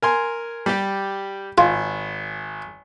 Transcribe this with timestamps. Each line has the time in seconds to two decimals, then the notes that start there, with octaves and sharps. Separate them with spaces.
0.02 A#4 G#5 C6
0.66 G3 G4
1.58 G#1 F4